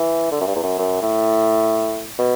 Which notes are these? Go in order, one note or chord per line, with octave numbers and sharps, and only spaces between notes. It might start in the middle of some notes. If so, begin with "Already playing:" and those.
Already playing: E3
D3
F#2
G2
E2
F#2
F#2
A2
B2